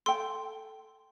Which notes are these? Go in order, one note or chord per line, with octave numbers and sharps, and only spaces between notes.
A4 G5 C6